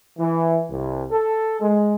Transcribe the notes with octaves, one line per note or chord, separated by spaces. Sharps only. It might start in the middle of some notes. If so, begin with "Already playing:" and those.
E3
C2
A4
G#3